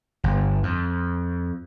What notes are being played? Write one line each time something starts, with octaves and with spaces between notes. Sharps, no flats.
G1
F2